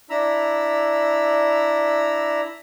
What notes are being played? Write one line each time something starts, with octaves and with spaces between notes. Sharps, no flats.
D4 E4 A#5 B5 E6